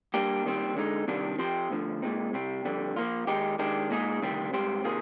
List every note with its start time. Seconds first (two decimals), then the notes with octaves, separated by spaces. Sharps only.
0.14 G3 A#3 D4 G4
0.45 D#2 D#3 G3 C4
0.77 D3 G#3 D#4
1.08 C3 D#3 G3 D4
1.39 F3 C4 G4 C5
1.70 D2 D3 F3
2.02 A#2 G#3 C4 D#4
2.33 C2 C3 G3 C4
2.65 F2 D3 G3
2.96 F3 A#3 F4
3.27 D#3 G#3 D#4 G4
3.59 D#3 G#3 D4 G4
3.90 A#2 G#3 D#4 G#4
4.22 D2 C3 D#3 G3 C4
4.53 G#2 G3 C4 G4 C5
4.84 C3 D#3 A#3 F4 G#4